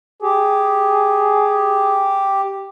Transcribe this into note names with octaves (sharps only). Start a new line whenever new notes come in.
G4 G#4